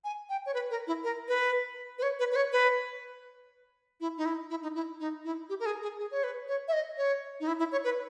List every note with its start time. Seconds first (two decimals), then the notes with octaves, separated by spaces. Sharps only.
0.04 G#5
0.29 G5
0.46 C#5
0.54 B4
0.70 A#4
0.87 E4
1.03 A#4
1.28 B4
1.98 B4
2.02 C#5
2.19 B4
2.32 B4
2.36 C#5
2.52 B4
4.00 E4
4.17 D#4
4.25 E4
4.50 E4
4.63 D#4
4.75 E4
5.00 D#4
5.24 E4
5.49 G4
5.60 A#4
5.66 G#4
5.82 G#4
5.99 G#4
6.11 C#5
6.23 B4
6.48 C#5
6.68 E5
6.73 D#5
6.97 C#5
7.40 D#4
7.47 E4
7.59 E4
7.72 C#5
7.84 B4